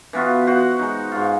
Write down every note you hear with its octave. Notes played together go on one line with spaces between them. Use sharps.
E3 B3 F4 F#4
F#4 C5 F#5
G#3 D#4
G#2 F4